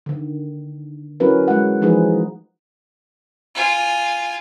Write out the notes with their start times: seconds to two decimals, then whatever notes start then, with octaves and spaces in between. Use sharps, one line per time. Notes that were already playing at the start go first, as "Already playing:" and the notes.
0.06 D3 D#3
1.20 F#3 C#4 E4 F#4 A#4 B4
1.48 G#3 F#5
1.82 E3 F3 G#3 D#4 G#4 B4
3.55 F4 G#5